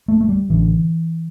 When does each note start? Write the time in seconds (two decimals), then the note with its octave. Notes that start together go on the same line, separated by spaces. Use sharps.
0.08 A3
0.21 A3
0.29 G3
0.50 A1 D3 E3